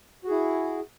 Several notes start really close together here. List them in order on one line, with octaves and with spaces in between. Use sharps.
F#4 G#4 E4